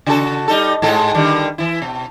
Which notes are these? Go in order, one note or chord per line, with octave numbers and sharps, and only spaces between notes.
C#3 F#4 A4
G3 D#4 A4
G#2 G#3 A4
D3 D#3 G3
E3 E4
B2